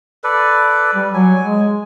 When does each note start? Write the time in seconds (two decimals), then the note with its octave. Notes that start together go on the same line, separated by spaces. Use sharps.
0.24 A4 B4 D5
0.95 G3
1.14 F#3 G#5
1.42 G#3